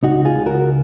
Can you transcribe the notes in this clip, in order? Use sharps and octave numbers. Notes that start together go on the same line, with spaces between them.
C#2 D#4 F#4
F4 G#4
C#2
F#4 A#4